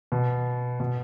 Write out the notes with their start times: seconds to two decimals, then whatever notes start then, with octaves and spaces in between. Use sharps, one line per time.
0.12 B2
0.80 B2